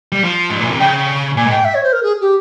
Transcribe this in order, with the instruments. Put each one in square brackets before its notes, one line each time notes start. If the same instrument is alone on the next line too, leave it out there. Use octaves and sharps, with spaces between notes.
[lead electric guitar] G3
F3
G#2
A#2
C3
[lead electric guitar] C#3 [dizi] G5
[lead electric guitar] A#2 [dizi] G#5
[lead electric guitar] G#2
[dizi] G5
E5
C#5
C5
A#4
G#4
G4